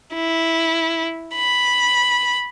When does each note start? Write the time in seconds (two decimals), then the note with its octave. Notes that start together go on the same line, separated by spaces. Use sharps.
0.15 E4
1.36 B5